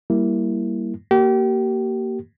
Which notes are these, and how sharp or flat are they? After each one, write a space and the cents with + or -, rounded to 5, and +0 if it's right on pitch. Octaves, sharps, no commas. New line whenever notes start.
G3 +0 A#3 +0 E4 +0
A#3 -10 G4 -35